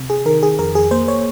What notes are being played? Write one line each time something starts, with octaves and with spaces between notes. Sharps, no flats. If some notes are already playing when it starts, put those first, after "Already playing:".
Already playing: C3
G#4
D#3 A#4
G#4
F2 A#4
G#4
A#3 C5
C#5